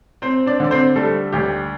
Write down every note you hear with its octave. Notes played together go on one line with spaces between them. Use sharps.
C4 C5
D4 D5
D3 D5
C4 C5
G3 A3 A4
D2 G4